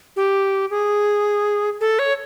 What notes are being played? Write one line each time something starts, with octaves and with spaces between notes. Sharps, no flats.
G4
G#4
A4
C#5